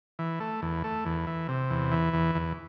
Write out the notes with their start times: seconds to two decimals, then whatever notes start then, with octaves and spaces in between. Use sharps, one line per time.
0.19 E3
0.40 A3
0.62 E2
0.84 A3
1.05 E2
1.27 E3
1.49 C3
1.70 E2
1.92 E3
2.14 E2
2.35 E2